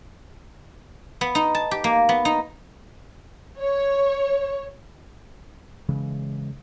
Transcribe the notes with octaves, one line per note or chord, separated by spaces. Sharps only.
B3
D#4
A5
G4
A#3
B3
D#4
C#5
C#3 E3 G#3